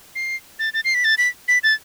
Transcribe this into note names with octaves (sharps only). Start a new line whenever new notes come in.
C7
A6
A6
C7
B6
A6
B6
B6
A6